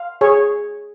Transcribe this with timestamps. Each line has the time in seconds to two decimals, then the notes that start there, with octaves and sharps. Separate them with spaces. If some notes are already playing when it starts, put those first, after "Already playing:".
Already playing: F5
0.21 G#4 C#5